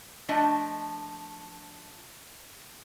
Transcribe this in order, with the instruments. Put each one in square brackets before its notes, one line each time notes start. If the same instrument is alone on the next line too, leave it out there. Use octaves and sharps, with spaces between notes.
[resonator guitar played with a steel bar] F3 A3 D4 D#5